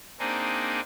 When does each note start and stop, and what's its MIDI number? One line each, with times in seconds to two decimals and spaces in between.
0.19 0.81 58
0.19 0.81 60
0.19 0.81 62
0.19 0.81 63
0.19 0.81 68